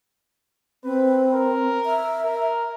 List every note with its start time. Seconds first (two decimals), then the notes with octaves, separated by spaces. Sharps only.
0.84 C4 B4
1.34 A#4
1.86 E5
2.24 A#4